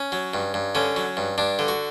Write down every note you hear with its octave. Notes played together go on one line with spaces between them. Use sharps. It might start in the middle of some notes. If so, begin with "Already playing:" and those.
Already playing: C#4
F#3
G2
G2
D3 C#4
F#3
G2
G2 D4
D3
F#4